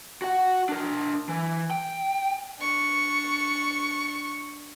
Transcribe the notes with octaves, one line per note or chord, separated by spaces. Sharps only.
F#4 F#5
D4 A#4
E3
G5
D4 C#6